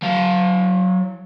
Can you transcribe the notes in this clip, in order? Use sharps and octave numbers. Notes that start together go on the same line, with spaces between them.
F#3 F5